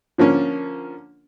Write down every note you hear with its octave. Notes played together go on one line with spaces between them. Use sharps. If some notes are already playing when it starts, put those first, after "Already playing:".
D3 F3 A#3 C#4